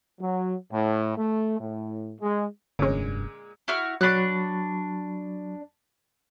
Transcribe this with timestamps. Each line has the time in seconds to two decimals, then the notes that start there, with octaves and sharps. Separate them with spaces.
0.21 F#3
0.72 A2
1.18 A3
1.60 A2
2.21 G#3
2.79 F1 G2 A#2 D3 G#3 C#4
3.68 E4 F#4 F6
4.01 F#3 D4 B5 C#6 F#6